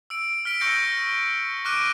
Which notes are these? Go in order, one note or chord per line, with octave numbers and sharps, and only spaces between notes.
E6 D7
F6 B6 D7
C#6 E6 G6 A#6 C#7 D7
C#6 D6 F6 F#6 D7 D#7